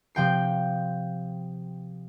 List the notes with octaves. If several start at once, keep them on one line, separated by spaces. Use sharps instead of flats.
C3 F3 G5 C7